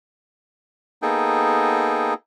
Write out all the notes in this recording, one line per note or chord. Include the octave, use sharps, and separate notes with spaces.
A#3 B3 D#4 G#4 A4 G5